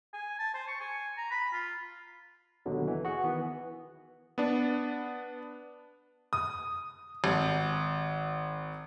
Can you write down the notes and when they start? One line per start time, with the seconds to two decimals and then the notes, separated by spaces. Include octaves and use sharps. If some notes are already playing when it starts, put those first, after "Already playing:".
0.14 G#5
0.39 A5
0.54 C5
0.68 C#6
0.80 G#5
1.17 A#5
1.31 B5
1.53 F4
2.66 D#2 B2 D3 F#3
2.87 E3
3.05 F#4 G#4 F#5
3.24 D#3 E3 B3
4.38 B3 D4
6.33 D#6
7.24 G#1